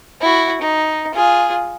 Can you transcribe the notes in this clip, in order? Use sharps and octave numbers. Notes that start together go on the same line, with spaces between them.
E4 F#4
D#4
F4 G#4